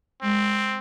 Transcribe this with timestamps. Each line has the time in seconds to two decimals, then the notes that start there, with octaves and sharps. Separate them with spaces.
0.22 G#3 C4